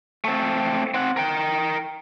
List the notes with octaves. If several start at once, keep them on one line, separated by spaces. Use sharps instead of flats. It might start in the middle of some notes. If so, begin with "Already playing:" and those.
A3 C4
C4 F#5
A#4 G5